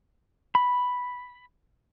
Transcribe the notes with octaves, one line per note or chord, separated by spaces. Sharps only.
B5